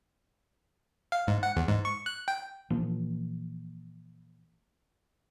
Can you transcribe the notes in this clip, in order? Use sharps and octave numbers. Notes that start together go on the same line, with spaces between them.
F5
G#2
F#5
E2
G#2
C#6
F#6
G5
A#2 E3 F3 A#3